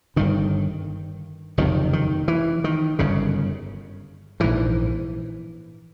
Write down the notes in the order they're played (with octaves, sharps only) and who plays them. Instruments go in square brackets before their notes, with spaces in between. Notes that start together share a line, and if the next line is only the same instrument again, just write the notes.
[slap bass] G1 G2 D3 D#3
F#1 F2 C3 D#3
D#3
E3
D#3
G1 F#2 C#3
A#1 G#2 E3